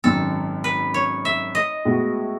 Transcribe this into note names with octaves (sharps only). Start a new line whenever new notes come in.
G#1 F#2 D#3 A4
B4
C#5
E5
D#5
A2 G#3 B3 F#4